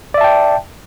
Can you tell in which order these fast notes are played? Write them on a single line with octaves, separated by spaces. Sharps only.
D5 E5 A5 G5